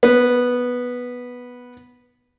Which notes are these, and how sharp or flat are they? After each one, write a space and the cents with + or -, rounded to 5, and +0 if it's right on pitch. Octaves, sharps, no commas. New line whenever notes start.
B3 -5